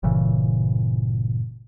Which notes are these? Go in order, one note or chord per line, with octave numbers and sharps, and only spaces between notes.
G1 A#2 C#3 E3